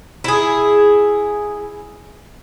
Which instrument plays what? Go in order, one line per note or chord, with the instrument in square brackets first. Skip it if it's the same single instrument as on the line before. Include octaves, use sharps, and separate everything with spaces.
[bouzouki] E4 G#4